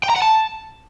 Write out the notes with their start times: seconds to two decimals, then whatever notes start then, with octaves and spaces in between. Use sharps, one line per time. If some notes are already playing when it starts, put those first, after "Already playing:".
0.03 G5
0.10 A#5
0.16 F#5
0.22 A5